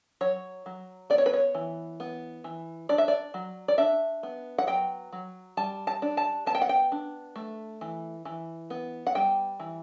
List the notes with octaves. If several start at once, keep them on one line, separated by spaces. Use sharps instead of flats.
F#3 C#5
F#3
B3 D5
C#5
B4
C#5
E3
B3
E3
D4 D5
E5
D5
F#3
D5
D4 E5
B3
F#5
F#3 G5
F#3
G3 A5
A5
D4
A5
B3 A5
G5
F#5
G5
D4
A3
E3
E3
B3
F#5
G3 G5
E3